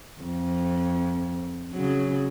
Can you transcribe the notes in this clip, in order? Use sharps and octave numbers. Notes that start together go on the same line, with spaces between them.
F2
C#3 F#3